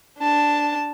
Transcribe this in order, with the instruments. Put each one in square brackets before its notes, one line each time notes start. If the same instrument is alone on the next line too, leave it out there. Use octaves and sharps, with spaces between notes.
[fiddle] D4 A5